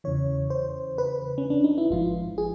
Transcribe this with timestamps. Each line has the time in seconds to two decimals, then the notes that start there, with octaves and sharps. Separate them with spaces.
0.04 E2 C#3 E3 C#5
0.50 C5
0.98 B4
1.38 C#4
1.50 D4
1.64 D#4
1.78 E4
1.91 G#1 G#2 F3 F4
2.38 G#4